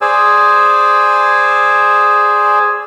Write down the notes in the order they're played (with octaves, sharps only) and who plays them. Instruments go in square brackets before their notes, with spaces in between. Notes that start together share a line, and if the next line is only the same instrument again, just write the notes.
[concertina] G#4 C5 D5 G#5 E6